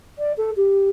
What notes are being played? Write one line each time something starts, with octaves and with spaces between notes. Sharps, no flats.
D5
A4
G4